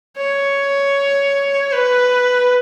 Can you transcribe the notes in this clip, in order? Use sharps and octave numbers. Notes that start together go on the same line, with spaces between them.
C#5
B4